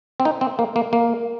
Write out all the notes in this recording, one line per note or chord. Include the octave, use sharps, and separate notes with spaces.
C4
D#4
C4
A#3
A#3
A#3